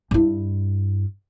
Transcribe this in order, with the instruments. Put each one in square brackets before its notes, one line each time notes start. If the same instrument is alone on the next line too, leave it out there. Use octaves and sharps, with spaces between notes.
[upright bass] G2 E4